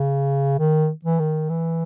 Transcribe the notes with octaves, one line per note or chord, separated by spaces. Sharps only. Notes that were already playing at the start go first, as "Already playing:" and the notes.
Already playing: C#3
D#3
E3
D#3
E3